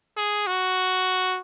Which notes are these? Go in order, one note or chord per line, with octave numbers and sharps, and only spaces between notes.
G#4
F#4